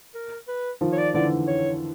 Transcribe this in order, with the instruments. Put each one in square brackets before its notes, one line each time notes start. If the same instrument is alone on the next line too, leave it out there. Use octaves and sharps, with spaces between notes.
[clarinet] A#4
B4
[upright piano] D#3 F3
[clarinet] C#5
D5
[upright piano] D3 E3 [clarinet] D5
[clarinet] C#5